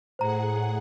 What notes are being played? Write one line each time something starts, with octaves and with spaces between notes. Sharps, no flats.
A2 G#4 C5 F#5 A#5